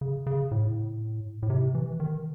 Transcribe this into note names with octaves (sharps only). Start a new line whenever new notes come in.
C#3
C#3
A2
A2
C3
E3
D#3